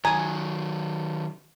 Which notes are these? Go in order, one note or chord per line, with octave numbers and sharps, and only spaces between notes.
D#3 F#3 G#5 A#5